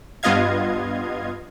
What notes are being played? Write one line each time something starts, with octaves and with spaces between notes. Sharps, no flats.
G2 B3 F4 D#5 F5 G#6